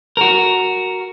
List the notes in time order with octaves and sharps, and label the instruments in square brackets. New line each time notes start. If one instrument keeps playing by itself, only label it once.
[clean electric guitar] F#4 A#4